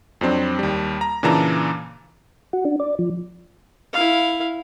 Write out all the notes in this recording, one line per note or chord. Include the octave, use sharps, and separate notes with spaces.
F2 F#3 C4 D4
D#2 G3
A#5
A#2 C#3 E3 D4 A5 A#5
F#4
D4
D5
F3
E4 F5